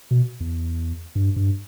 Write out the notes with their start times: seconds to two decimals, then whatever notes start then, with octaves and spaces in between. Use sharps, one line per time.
0.11 B2
0.40 E2
1.15 G2
1.36 G2